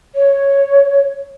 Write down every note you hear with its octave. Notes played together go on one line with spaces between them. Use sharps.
C#5